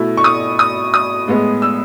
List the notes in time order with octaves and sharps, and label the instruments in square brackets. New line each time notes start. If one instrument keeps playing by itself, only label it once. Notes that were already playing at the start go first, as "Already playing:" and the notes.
Already playing: [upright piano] B2 A3 E4
C#6
D#6
D#6
D#6
A2 G#3 B3
E6